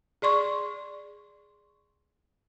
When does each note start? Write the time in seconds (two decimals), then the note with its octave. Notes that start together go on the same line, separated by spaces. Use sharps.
0.22 G#4 D5 C6 C#6